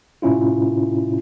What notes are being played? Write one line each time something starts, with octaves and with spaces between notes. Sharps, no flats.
A2 C3 C#4 E4 F4